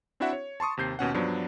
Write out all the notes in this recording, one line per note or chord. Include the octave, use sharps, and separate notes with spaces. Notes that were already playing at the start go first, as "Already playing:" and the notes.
C4 D4 E4 F#4 E5 F#5
C#5
A5 C6 C#6 D#6
D#2 C3 G6 C7
D#2 B2 C#4 F#5
G2 F3 F#3 B3 D4